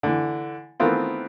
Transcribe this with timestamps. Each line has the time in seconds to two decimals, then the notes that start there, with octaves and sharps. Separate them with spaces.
0.03 D3 E3
0.80 D#3 E3 A3 B3 C4 F4